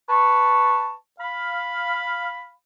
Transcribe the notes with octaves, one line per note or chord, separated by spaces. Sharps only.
B4 A5 C#6
F5 B5